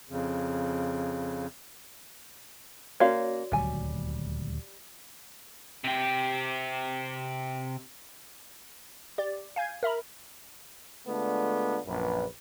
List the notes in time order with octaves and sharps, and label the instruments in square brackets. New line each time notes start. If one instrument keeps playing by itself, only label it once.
[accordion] F2 C#3
[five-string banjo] A#3 C#4 F5 [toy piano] F#4 C#5 D5
[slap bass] D#1 D2 F#3 [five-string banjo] G3 G#5
[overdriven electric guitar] C3 G4
[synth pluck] G4 D5
F5 G#5 G6 G#6
A#4 E5 A#5 B5
[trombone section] D3 G#3 A3 B3 D4 F4
A#1 F#2 B4